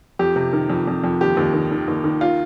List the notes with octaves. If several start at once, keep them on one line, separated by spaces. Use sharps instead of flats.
F2 G4
C3
D#3
F2
F2
F2
D#2 G4
D#2
D#3
D#3
D#2
D#3
F4